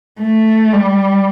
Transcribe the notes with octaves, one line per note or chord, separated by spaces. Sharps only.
A3
G3